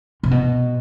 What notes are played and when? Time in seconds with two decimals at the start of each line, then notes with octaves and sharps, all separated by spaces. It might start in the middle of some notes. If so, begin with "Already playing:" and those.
0.23 C3
0.31 B2